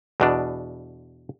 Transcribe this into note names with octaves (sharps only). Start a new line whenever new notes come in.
E2 B2 D4